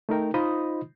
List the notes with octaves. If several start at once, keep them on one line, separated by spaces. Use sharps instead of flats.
A3 D#4 A#4 G5
D#4 F4 C5 D#5 B5 D#6